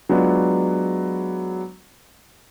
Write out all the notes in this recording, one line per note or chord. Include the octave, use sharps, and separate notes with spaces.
F#3 G#3 B3 D4 F4